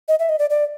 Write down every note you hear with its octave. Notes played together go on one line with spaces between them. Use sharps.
D#5
E5
D#5
D5
D5